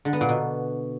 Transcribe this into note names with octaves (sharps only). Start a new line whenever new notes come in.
D3
B3
A#2
B2